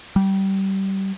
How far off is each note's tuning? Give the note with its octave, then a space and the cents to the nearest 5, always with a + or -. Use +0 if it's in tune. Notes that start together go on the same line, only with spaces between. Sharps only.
G3 -20